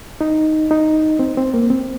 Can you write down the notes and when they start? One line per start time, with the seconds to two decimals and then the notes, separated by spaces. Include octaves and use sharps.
0.21 D#4
0.71 D#4
1.19 C4
1.37 C4
1.54 A#3
1.70 C4